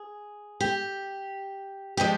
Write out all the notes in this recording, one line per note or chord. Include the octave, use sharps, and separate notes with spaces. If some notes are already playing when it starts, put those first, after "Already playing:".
Already playing: G#4
G4
F3 G#3 G4